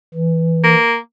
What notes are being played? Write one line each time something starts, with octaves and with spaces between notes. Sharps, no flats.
E3
A#3